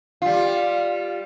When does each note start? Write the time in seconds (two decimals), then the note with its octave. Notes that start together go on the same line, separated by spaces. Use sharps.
0.22 G3 F4